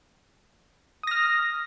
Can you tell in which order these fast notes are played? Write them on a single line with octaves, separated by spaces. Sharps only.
D#6 A#6 F6